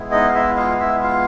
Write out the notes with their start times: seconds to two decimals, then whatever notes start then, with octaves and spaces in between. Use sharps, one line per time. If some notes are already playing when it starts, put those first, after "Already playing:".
Already playing: G#3 B3 E4
0.11 D#4 D#5
0.28 F5
0.35 E4 E5
0.57 F4 F5
0.80 E4 E5
1.03 F4 F5